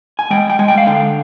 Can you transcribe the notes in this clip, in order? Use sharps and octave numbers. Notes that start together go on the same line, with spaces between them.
G#5
G#3 G5
G5
G#3 G#5
G5
F5
D3 G5